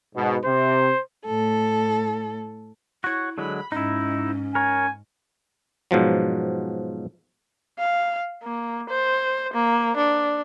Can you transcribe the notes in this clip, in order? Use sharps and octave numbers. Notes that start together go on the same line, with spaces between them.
G#2 B2
C3 C5
A2 A4
E4 F#4 C#5
D3 F#3 G#3 B5
G#2 C#4 D#4 E4
A#4 C#5 G#5
G#2 B2 F3 F#3
F5
A#3
C5
A#3
D4